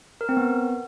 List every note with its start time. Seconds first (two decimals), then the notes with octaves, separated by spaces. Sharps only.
0.21 A#4
0.29 C4
0.37 B3